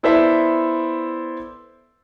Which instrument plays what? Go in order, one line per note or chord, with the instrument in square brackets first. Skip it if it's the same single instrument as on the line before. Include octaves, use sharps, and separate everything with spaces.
[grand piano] B3 E4 A4 C5 D5 E5